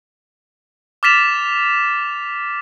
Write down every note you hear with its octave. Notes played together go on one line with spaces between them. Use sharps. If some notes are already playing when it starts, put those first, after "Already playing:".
D6 F6 A6 B6 E7 F7